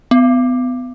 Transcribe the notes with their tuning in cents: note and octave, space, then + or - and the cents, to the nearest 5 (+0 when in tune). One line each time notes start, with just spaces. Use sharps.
B3 +30